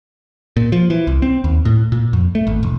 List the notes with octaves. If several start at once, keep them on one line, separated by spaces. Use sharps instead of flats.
A#2
F3
E3
C2
C4
D#2
A2
A#2
F2
A3
G#1
E1